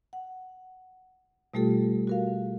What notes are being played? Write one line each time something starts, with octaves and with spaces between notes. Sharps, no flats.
F#5
B2 G3 A3 F4 G4 A4
F#4 A#4 F5